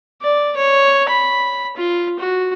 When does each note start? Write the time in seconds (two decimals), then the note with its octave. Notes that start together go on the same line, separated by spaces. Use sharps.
0.22 D5
0.57 C#5
1.09 B5
1.76 F4
2.19 F#4